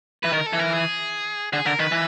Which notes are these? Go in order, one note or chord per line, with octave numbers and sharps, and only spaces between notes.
E3 B4
D#3 A#4
A4
E3
A#4
G#4
D3 G#4
D3 A#4
D#3 B4
E3